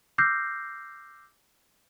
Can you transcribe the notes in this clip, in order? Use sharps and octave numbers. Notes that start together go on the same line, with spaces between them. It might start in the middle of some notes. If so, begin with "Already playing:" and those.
D6 E6 F6 G6 A#6 C7